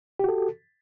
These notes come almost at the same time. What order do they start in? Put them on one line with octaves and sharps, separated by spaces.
G4 F#4 A4